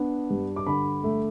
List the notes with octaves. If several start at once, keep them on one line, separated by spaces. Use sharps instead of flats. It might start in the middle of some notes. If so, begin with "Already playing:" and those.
Already playing: B3 D4
G2
D6
D3 B5
A3